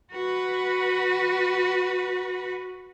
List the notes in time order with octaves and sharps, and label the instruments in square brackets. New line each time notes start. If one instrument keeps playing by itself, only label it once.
[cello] F#4 B4